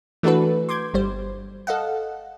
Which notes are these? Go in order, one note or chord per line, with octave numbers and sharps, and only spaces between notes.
E3 A3 D4 F#4 A4 B4
C6 D6 G6 G#6
G1 G3 C5
A4 D#5 F5 F#5